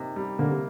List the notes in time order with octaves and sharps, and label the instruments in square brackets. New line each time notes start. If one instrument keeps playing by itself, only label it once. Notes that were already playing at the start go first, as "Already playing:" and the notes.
Already playing: [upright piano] C3 A#3 D#4
G3
[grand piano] D3 [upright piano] A#3
[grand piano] C3